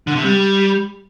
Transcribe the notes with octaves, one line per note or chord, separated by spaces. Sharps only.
D3
C3
G3